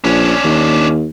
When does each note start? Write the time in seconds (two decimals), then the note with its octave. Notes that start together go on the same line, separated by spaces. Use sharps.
0.04 A#1 C#4 D4
0.44 D#2